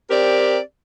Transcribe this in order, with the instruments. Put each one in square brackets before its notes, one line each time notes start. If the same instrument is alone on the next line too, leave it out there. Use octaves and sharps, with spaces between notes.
[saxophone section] C4 G4 A#4 D5